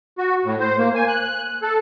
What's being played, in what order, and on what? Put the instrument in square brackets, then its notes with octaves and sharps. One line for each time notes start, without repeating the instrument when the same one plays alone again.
[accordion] F#4
A2
C5
A#3
G#5
F#6
A4